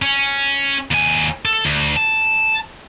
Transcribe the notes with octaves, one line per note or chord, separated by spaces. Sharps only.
C#4
D#2 G#5
A4
D2
A5